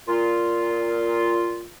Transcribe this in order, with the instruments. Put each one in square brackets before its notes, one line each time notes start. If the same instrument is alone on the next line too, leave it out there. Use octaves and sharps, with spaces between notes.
[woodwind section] A#2 F4